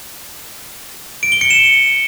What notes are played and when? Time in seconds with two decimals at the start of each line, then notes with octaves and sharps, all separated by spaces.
1.23 D7
1.32 G7
1.41 C#7
1.50 E7